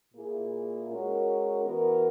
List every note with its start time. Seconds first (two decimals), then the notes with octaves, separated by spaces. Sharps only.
0.14 A#2 A#3 E4 G#4
0.89 G#3 C#4 F#4 A#4
1.64 E3 B3 F#4 A#4